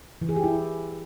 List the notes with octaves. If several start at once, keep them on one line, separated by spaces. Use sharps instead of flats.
E3
G#4
G4
E4